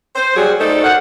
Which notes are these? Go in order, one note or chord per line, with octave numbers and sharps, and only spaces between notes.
C5
F#3 G3 F#4 G#4
A3 D#4 A4 C5 D5
A#4 C5 F#5